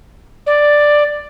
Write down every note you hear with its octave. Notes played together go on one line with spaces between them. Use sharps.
D5